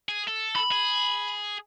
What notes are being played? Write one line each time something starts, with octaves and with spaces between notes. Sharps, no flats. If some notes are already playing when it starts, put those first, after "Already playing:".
G#4
A4
B5
G#4